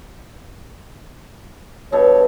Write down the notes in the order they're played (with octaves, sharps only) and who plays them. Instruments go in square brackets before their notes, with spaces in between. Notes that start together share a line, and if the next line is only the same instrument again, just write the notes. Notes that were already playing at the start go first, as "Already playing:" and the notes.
[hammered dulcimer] G2 B2 A4 [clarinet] C#5